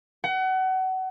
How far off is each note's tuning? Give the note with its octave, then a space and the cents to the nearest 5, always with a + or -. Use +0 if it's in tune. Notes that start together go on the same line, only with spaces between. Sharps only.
F#5 +30